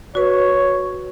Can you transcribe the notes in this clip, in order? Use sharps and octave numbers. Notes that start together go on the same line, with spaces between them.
F#4 B4 C#5